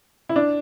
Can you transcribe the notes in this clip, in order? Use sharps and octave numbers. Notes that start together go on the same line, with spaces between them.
E4
D4